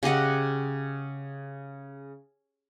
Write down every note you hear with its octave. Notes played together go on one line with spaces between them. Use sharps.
C#3 G4 D#5 F#5